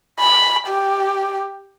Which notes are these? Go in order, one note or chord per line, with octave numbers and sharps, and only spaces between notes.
B5
G4